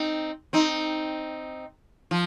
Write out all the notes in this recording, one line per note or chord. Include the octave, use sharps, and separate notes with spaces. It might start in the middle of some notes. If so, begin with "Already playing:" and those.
Already playing: C4 D#4
C4 D#4
F3